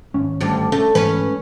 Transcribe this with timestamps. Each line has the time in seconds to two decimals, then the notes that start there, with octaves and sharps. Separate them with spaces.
0.14 G#1 C#4
0.40 D2 G2
0.72 A3 C#4
0.95 G#2 E3 C#4 B4